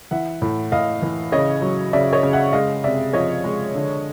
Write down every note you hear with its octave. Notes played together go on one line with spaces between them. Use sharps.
E3 E5 F#5
A2
A2 D#5 F5
E3
C#3 C#5 D#5
F#3
C#3 D5 E5
C#5 D#5
C#3
E5 F#5
G#3 D#5 F5
C3 D5 E5
F3 C#5 D#5
G#3
D3